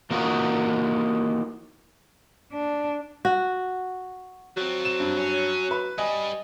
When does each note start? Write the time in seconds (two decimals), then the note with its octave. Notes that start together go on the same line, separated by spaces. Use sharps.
0.11 E3 A#3 D#4 F4 F#4
2.52 D4
3.25 F#4
4.57 F3 F#3 C4
4.85 E7
5.00 G2
5.17 C#4
5.71 B4
5.98 G3 B4 D#5 G#5